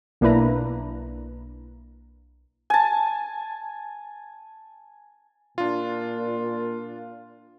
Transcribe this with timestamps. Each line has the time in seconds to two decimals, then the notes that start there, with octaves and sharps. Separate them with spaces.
0.21 B1 A#3 D4 E4 B4 A#5
2.70 G#5 A5
5.58 A#2 D4 F4